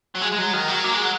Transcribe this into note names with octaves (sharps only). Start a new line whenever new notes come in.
F#3
G#3
G#3
F#3
D#3
F#3
A#3
G#3
F#3